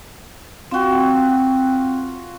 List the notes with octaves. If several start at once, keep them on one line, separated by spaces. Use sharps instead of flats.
C4 F4 F#4 G5